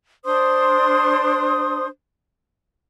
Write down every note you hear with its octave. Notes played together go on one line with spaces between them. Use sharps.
D4 C5 C6 D#6